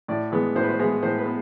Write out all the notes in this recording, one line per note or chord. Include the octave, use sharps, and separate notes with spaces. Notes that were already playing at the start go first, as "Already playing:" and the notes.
A2 D5
E3 G#3 B3
A2 C5
B4
C5
E3 G#3 B3
A2 C5
B4
B3